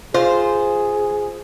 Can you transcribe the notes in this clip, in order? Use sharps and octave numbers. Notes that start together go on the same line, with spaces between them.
F4 G#4 C5